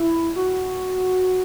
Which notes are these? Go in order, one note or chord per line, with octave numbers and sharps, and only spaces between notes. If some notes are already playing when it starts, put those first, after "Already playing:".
Already playing: E4
F#4